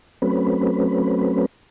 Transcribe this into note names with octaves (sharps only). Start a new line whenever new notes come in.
F#3 A3 C4 C#4 B4